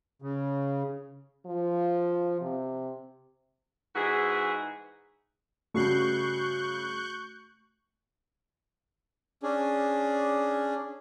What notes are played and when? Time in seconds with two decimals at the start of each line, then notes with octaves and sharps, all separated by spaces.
0.22 C#3
1.46 F3
2.41 C3
3.96 G#2 E3 F#4 G#4
5.74 G2 C#3 A3 F#4 C#6 F#6 G6 C7
9.43 C#4 D4 G#4